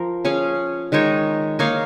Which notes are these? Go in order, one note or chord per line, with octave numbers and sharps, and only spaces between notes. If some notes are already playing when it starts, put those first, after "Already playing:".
Already playing: F3 A#4
C#4 G#4 C#5 F5
D#3 G#3 D#4 C#5
A#3 D#4 C#5 F5